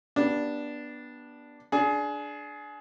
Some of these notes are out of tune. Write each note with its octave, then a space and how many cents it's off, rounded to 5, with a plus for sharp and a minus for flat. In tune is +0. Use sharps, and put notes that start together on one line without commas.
B3 -25 D4 +0 G4 +0
D4 +0 G#4 +25